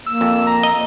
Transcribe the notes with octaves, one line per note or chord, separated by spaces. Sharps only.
A#3 E6
F2
A#5
D#5